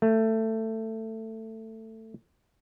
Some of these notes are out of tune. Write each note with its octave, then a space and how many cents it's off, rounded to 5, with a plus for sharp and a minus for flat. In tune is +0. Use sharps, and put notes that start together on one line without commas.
A3 +15